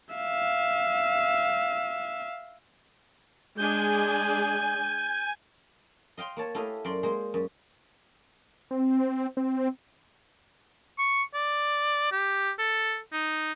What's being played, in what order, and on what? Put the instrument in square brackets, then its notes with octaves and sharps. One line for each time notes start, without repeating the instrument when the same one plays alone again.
[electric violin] E5 F5
[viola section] G#3 D4 G#4 [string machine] G#5 [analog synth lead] G6
[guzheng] D#5 F5 G5 C6
A#3 C#5 A5
A3 E4 G4 D#5 F5 G#5
F#2 A#4 D5 C6
G#3 A#3 C5 C6
F#2
[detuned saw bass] C4
C4
[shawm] C#6
D5
G4
A4
D#4